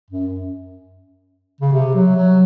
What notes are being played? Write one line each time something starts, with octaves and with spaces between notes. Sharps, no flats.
F#2
C#3
C3
F#3
F#3